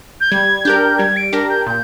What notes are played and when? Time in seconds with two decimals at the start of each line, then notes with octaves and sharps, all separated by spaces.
0.21 G6
0.31 G3 G#6
0.65 D4 G4 A#4 G6
0.98 G3 G#6
1.16 D7
1.33 D4 G4 A#4 A#6
1.50 G6
1.66 A#2 G6